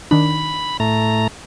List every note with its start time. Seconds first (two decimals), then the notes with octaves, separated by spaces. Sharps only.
0.11 D#3 D4 B5
0.80 A2 A3 A#5